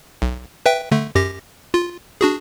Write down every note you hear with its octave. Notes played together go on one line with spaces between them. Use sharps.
B1
B4 E5 G5
D3 A3
F#2 G4 A#6
F4
D4 F#4 G#4